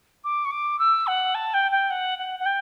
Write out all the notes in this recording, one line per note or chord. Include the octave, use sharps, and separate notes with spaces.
D6
C#6
D6
E6
F#5
A5
G5
G5
F#5
F#5
F#5
G5